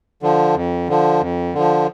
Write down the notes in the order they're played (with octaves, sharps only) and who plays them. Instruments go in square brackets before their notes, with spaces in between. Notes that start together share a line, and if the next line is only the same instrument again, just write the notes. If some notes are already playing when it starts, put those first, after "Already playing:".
[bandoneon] D3 F3
F2
D3 F3
F2
D3 F3